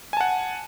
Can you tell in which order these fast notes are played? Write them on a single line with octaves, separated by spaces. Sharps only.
G#5 A5 F#5